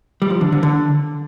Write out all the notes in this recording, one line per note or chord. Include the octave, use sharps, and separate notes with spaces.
G3
F3
D3
D3
D3